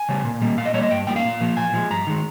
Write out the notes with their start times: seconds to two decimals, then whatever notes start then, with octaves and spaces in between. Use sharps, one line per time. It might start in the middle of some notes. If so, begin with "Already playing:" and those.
Already playing: G#5
0.09 C#3 G3
0.25 A#2
0.42 G3 A#3
0.57 A#2 F5
0.66 D#5
0.74 G3 A#3 C#5
0.82 D#5
0.91 G2 G5
1.07 G3 A#3 G5
1.16 F5
1.24 A#2
1.41 F3 A#3
1.57 A#2 G#5
1.74 F3 G#3
1.90 G2 A#5
2.07 D#3 G#3